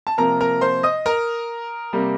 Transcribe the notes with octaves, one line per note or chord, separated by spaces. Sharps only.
A5
C3 F3 A#3 A#4 A#5
A#4 A#5
C5 C6
D#5 D#6
A#4 A#5
C3 G3 A#3